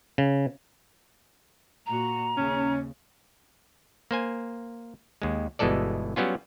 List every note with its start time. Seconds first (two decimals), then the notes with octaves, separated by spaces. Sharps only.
0.18 C#3
1.86 A#2 F#4 A#5
2.37 D#2 C#3 C#4
4.11 A#3 C5 G#5
5.22 D#2 G#3
5.59 G1 B2 E3 G#3 A4 D5
6.16 F#3 G3 B3 C#4 F4